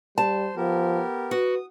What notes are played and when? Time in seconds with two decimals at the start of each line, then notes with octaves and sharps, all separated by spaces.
0.18 G3 C5 A5
0.57 F3 B3 G4 A#4
1.31 F#4 B4 D#6